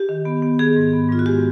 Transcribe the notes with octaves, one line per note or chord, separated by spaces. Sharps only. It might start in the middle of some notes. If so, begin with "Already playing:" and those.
Already playing: G4
D#3
B3
B3
D#3 G#4
G#2
B3
G#2 F4
F#4
G#3 G4